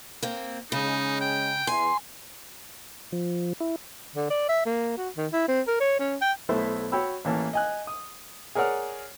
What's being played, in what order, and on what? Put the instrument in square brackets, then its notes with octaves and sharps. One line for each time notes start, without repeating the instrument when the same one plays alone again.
[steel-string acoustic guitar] A#3 C4
[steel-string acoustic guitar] C#3 [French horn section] G#3 C#4 [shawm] D#4
[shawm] G5
[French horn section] E2 E3 [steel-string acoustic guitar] G#5 [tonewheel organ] C6
[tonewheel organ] F3
E4
[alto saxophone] D3
D5
E5
A#3
F#4
D#3
E4
C4
A#4
C#5
C#4
G5
[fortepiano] B1 A3 B3 E4 C5
F#4 C#5 G5 B5 E6
A1 E3 A#3 C#5 A5
D#5 G#5 F#6
D#6
G#4 A#4 C#5 D5 F#5 F6